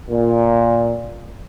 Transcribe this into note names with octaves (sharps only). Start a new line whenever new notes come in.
A#2